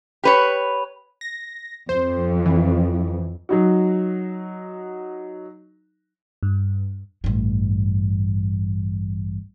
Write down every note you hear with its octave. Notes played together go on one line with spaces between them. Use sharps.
G4 B4 C#5
A#6
F2 C5
E3
F#3 D#4 F#4
G2
A1 G2